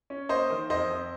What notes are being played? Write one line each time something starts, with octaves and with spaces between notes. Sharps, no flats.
C#4
A#3 C5 D#5
D#3
F2 C5 D#5
F2